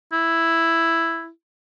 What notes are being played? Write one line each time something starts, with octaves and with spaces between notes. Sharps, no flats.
E4